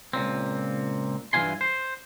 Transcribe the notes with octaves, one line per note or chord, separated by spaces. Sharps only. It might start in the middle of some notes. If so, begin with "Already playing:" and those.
C#2 A#2 C4
G2 E3 C#4 F4 G#5 C6
C5